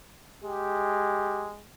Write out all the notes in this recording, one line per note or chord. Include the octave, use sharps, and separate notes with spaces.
G#3 G4